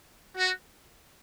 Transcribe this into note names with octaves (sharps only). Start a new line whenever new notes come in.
F#4